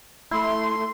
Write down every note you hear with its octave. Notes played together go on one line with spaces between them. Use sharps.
A3 E4 C6